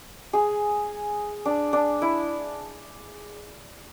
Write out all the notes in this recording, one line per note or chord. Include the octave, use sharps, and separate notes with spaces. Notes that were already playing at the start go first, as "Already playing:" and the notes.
G#4
D4
D4
E4